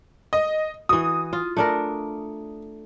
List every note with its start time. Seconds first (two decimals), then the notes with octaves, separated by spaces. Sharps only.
0.33 D#5
0.89 E3 F#4 D#6
1.33 F4
1.57 A3 D4 A#4